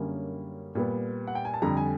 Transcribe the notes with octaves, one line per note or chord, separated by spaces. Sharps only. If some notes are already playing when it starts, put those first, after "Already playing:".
Already playing: F#2 D3 G3 A#3 C#4
A#2 G3 B3
F#5
G5
G#5
A5
F2 D3 G3 A#5
G#5